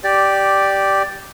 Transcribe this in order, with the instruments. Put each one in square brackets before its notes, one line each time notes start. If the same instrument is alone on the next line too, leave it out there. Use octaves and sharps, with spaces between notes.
[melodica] G4 D5